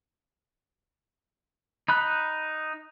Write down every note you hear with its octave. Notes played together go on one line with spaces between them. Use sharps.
D#4 B5 F#6